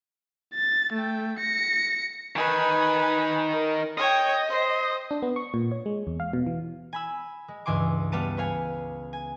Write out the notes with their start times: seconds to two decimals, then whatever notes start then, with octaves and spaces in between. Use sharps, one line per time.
0.55 A6
0.93 A3 G5
1.39 A#6 C#7
2.36 D#3 D#4 B4 G#5
3.51 A#4
3.98 C#5 D#5 G5
4.49 C5
5.11 D4
5.22 B3
5.36 C#6
5.54 A#2
5.72 C#5
5.86 G#3
6.07 E2
6.20 F5
6.33 B2
6.47 E3
6.93 G#5 B5 E6
7.48 G#3
7.66 C#2 G2 E3 G#5 C6 D6
8.12 G3 B3 F5 A5 D#7
8.37 B4 C#5 F5 G#5
9.13 G#5